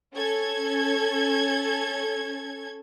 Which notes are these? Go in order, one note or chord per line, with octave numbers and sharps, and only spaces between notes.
C#4 A4 G#6